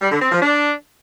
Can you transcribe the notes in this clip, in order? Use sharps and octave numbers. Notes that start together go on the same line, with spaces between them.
G3
D3
C4
F3
D4